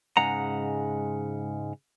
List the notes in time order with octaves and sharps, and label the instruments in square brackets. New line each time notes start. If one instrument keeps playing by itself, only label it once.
[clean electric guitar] G#2 C#3 G#3 F#5 A#5